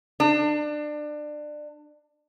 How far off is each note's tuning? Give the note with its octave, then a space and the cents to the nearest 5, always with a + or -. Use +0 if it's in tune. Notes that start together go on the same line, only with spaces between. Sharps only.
D4 +25